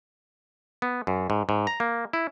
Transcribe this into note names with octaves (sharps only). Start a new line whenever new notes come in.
B3
F#2
G#2
G#2
A#5
A#3
E4